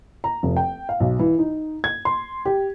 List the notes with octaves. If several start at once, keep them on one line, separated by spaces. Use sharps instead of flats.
A#5
F1
G5
F5
B1
E3
D#4
G#6
C6
G4